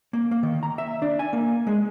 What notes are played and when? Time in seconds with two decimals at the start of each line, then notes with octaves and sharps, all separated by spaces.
0.13 A#3
0.31 A#3
0.43 D#3
0.63 A#5
0.78 E5
1.02 D4
1.19 G#5
1.33 A#3
1.67 G#3